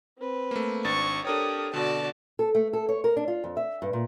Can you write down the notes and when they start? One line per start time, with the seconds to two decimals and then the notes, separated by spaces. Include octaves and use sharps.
0.18 C4 B4
0.51 A3 A#3
0.84 G#1 D4 C#6 A6
1.25 D4 G4 A4 A#4 C#5 D#6
1.74 B2 D3 F#4 D5 A5
2.39 A4
2.55 A3
2.73 A4
2.89 C#5
3.04 A#4
3.17 D4
3.28 F4
3.44 F2
3.57 E5
3.82 G2
3.93 A#2